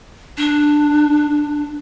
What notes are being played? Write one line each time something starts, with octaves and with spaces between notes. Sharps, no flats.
D4